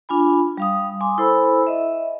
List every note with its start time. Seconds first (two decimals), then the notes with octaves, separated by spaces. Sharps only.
0.09 D4 F4 G#5 B5
0.57 G3 F5 D#6
1.01 G#5 C6 D6 D#6
1.18 E4 A4 C5 G#5 B5 E6
1.67 D#5 E5